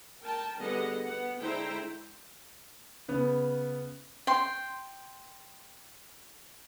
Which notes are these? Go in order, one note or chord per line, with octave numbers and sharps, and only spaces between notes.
A#4 G5 A5
D3 G3 B3 G#4 D#5 F#5
B3 F#5
D3 G#3 E4 C5 G5 A#5
C#3 B3
G5 C6